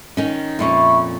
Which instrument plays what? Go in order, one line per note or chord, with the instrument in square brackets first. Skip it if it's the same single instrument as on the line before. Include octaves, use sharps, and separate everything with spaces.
[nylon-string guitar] D#3 C#4
[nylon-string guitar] F2 A#2 C#4 [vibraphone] E5 B5 C#6